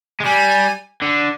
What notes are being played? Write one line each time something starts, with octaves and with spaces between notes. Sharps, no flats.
G#3
G3 G#5
D3